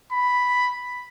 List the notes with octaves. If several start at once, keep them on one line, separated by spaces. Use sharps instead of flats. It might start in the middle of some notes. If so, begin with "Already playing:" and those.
B5